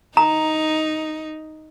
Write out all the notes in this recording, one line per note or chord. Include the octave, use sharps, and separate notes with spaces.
D#4 A#5